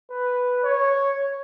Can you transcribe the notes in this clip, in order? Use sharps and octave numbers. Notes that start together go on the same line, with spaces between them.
B4
C#5